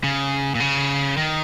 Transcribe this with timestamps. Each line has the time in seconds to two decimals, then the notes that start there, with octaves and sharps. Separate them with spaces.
0.04 C#3
0.55 A#2
0.60 C#3
1.17 D#3